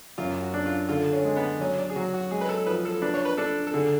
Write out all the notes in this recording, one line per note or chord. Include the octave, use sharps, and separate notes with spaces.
F#2 F4
F#4
D4
F4
D3 F4
C#4
G#3
B3
F#3 C#4
D4
G#4
F#3 F#4
F#4
G#3 G#4
B4
A4
F3 B4
A4
D4 B4
C#5
B4
D4 A4
A4
D3 G#4